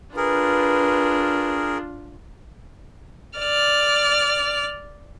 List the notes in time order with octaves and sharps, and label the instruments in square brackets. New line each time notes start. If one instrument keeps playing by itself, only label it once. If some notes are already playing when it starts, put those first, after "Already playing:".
[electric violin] D4 F4 [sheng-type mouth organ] G#4 A#4 [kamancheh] B4
[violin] D5 F6